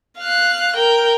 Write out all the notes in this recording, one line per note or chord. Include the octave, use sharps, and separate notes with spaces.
F5 F#6
A#4 G5